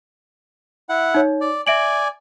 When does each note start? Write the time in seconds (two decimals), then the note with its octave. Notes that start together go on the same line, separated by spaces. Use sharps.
0.89 E4 F#5
1.14 D#4 C#5
1.41 D5
1.67 D5 E5 G#5 D7 F#7